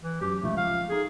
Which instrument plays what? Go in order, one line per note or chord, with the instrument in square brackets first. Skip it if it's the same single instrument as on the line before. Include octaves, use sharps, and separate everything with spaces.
[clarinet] E3
[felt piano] F#2 [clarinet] G4
[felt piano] C#2 F3 [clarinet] A3
[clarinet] F5
[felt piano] D#4 A4 [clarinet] G#4